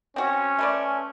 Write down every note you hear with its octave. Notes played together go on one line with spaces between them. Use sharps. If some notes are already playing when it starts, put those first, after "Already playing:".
C4 C#4 F#4
A3 B4 D5